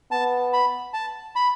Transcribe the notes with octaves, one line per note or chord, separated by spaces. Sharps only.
B3 A5
B5
A5
B5